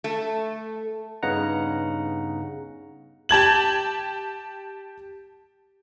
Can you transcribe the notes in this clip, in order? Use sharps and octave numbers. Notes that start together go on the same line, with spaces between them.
A3
G2 C#3 B3 D#4 F#5 A#5
G4 A5 G#6 F#7